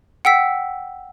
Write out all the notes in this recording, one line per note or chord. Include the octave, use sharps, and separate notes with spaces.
F#5 G5 E6 B6